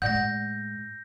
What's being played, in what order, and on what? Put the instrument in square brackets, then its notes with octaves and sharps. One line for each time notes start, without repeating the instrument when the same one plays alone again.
[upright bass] A2 G#3 [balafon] D5 F#5 [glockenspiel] G6 A#6